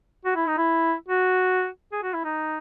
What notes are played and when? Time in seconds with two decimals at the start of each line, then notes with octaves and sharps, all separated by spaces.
0.25 F#4
0.36 E4
0.47 D#4
0.57 E4
1.08 F#4
1.92 G#4
2.03 F#4
2.13 E4
2.25 D#4